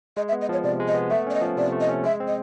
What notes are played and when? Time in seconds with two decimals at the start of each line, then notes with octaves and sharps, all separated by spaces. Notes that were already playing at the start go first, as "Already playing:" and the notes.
0.17 G#3 D#5
0.28 E5
0.32 B3
0.41 D#5
0.49 F3 C#5
0.64 C3 D5
0.80 G#3
0.88 D#5
0.95 B3
1.10 A3 E5
1.27 C#4 D5
1.34 D#5
1.41 F3
1.57 C3 D5
1.72 A3
1.81 D#5
1.89 C#4
2.04 G#3 E5
2.20 C4
2.28 D#5